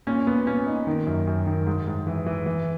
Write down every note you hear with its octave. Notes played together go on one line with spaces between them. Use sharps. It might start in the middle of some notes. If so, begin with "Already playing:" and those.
A#2 C#4
A#2 B3
A#2 C#4
A#2 D#4
D#3
F#2
F#2
D#3
G#2
G#2
E3
E3
E3